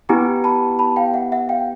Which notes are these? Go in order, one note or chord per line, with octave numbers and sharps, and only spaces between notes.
B3 E4 G4 G#5 A#5
A5 B5
A5 B5
F5 G5
E5 F#5
E5 F#5
F5 G5